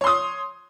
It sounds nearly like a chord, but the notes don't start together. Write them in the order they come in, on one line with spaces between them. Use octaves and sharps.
C#5 C6 D#6